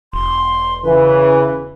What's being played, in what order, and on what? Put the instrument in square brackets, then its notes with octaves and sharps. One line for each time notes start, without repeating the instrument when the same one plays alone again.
[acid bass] E1 [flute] C6
[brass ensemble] C#3 E3 [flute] B4